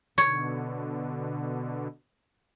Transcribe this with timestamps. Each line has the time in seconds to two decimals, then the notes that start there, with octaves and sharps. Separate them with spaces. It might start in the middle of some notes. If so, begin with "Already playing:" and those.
0.18 B2 D3 C#5